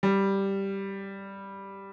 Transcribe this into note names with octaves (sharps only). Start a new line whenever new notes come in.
G3